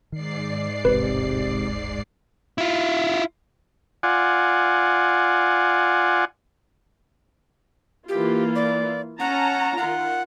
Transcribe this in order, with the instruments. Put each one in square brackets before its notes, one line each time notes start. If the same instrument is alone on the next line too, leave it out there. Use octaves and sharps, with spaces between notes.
[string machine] G#2 D5 C7 [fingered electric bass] D#3
[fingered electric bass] E1 A1 G#3 [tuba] C3 [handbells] B4
[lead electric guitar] E4 F4
[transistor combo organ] F4 D5 F#5 G#5
[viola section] E3 A#3 F4 [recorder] G4
[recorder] D5
[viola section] C#4 A5 A#5 [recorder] F#5
[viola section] D#3 F4 [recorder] F#5